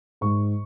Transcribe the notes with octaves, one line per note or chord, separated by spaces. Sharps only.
G#2 C#6